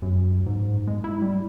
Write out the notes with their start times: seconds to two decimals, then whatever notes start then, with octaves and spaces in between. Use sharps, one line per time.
0.02 F#2
0.46 G#2
0.87 G#3
1.04 E4
1.22 G3